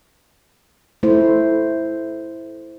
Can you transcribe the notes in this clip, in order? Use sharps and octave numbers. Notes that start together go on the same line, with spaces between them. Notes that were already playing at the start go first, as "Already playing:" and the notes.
A3 E4 C5